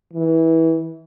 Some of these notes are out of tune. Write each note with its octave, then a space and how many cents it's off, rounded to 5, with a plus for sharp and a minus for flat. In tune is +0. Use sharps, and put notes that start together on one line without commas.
E3 -20